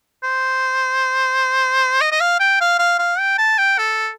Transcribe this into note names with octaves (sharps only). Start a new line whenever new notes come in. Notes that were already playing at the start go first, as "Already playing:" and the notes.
C5
D#5
D#5
F5
G5
F5
F5
F5
G5
A5
G5
A4